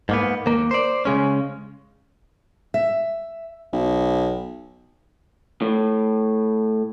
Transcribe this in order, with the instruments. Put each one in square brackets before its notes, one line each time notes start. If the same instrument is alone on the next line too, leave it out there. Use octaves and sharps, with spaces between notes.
[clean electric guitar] G#2 A#3 B3
D#2 A#3
C5 D5
C#3 G#3 C#4
[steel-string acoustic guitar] E5
[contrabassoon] B1
[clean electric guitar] A2